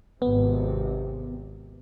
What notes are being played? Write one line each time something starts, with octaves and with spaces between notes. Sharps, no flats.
G#1 C3 B3